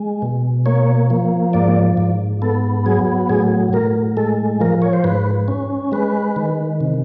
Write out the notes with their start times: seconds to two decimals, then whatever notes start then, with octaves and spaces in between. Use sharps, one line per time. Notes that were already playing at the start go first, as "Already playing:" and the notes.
Already playing: G#3
0.22 B2
0.66 A#3 C#5
1.10 F3
1.53 G#2 D5
1.97 G#2
2.42 B3 A4
2.86 F#3 G#4
3.29 A2 G#4
3.73 A2 A#4
4.17 G#3 A4
4.60 F3 A#4
4.82 C#5
4.93 C5
5.04 G#2 B4
5.48 C#4
5.92 G#3 B4
6.36 D#3
6.81 C3